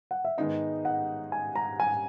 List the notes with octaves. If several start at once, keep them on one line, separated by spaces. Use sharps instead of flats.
F#5
E5
G#2 D#3 G#3 B3 D#4 D#5
F#5
G#5
A#5
G#5